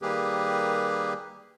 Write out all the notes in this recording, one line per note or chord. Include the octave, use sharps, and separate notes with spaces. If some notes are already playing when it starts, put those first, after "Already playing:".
D#3 G3 A#3 G4 G#4 B4